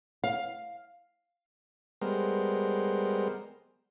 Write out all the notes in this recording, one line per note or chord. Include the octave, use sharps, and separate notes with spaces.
F5
G3 G#3 B3 A#4 C5